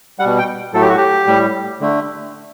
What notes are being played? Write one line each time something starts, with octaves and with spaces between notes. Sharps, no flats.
G3 F#5
B2
G5
A2 F#3 A3 A4
G4
F#4
G4
A2 G3
D3 A3